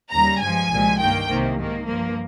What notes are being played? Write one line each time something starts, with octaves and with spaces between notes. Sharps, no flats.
D#2 C#3 G3 A#5
G2 F3 G#3 G#5
C2 A#2 F3 G#3
G2 D#3 A#3 G5
C2 C3 D#3 A#3
G#2 D#3 A#3
G2 F3 A#3